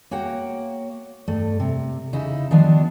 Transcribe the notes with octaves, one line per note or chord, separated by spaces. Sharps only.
A#3 F#4 C#5 F#5 G5
G2 A3
C3
C#3 D#4 E4
D#3 F3 G3 B3 D4